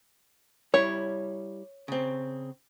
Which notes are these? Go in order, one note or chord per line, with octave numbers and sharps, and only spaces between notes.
G3 E4 C#5
C#3 C4